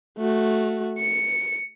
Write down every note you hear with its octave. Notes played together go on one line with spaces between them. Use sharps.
A3 F#4
C#7